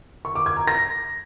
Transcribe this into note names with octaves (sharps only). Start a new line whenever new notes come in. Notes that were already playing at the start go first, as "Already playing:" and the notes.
C#6
D6
G#6
A#5
A#6